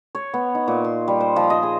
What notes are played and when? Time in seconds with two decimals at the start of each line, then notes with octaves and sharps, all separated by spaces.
0.15 C#5
0.34 B3
0.55 D#4
0.68 A#2
0.84 C6
1.08 G3
1.21 C5
1.36 F3
1.50 D#5
1.63 G#4